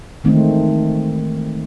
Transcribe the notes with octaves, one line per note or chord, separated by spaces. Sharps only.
D#3 E3 G#3 A3 C4 D#4